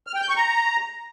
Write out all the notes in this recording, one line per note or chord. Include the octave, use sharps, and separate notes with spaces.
F6
G5
G6
C#6
A#5